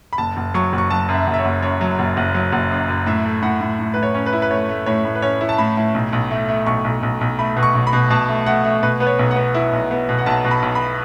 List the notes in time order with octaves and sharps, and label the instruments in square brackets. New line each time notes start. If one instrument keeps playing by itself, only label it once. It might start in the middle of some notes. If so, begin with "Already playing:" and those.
[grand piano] B5
F#1 A5
F#1
F#3 C#6
F#1
C#6
F#3 A5
F#2
E5
F#1
E5
C#5
F#1
F#2 C#5
F#3
F#1
F#1
F#3
F#1
F#2
F#2
A2 E5
A3
A2 F#5
A2
A2
A2 B4
C#5
C#4
B4
E4
B4
A3 C#5
A3
A2 C#5
A2
B4
C#4 C#5
E4
A5
A2 B5
A2
B1
B1
A3
A3
B1 C#6
B1
B1
B1
A3 B5
B2
C#6
B1
B5
B2
B2 A5
A3
A3 F#5
A3
B2 B4
B3 B4
C#5
B1
F#5
B3
E4
B1
B3
B2
F#5
B1 A5
B2
B5
B1
B5